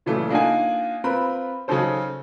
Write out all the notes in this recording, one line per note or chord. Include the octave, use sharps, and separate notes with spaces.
A#2 C#3 E3 F#3 A3
A#3 D4 D#4 F4 F#5 G#5
C4 F4 A#4 B4 B5
C#3 F#3 C#4 D#4 A4 C5